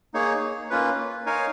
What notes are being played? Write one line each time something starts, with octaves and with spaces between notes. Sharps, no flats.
A#3 D#4 G#4 C#5
A#3 C#4 F4 B4
D#4 A#4 C#5 F5 G#5